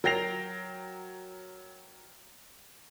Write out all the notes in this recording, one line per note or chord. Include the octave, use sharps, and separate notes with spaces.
F#3 A#4 G5 A#6 C7 F7